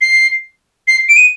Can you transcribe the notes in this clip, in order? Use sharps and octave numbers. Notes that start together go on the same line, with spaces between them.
C7
C7
D7
D#7